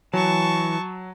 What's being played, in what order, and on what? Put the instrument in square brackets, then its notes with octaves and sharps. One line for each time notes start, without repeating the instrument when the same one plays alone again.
[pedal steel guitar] E3 [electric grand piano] F#3 [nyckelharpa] A5 C#6